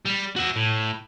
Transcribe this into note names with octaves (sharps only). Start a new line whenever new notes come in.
G3
F#4 E5
A2